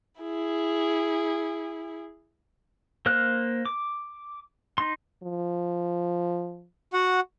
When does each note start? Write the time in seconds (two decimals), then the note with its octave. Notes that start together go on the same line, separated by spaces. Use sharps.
0.20 E4 G#4
3.06 A#3 C5 F6 F#6
3.66 D6
4.78 D#4 C6
5.23 F3
6.93 F#4 F#5